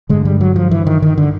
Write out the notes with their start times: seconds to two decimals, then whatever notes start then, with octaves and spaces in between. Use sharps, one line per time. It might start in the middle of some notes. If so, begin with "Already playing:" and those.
0.09 G2 D3 G#3
0.25 G3
0.41 F#3
0.56 F3
0.71 E3
0.87 D#3
1.02 D#3
1.18 D3